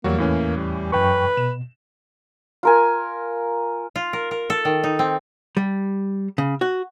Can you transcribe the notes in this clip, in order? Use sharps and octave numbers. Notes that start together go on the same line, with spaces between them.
E2 F#3 G3 A#3 F#4
A2 E3 C#4
G3
F#2 B4 G5 C#6
B2 E7
F4 A#4 G#5
F4
A#4
A#4
A4
D#3
D#4
C4
G3
C#3
F#4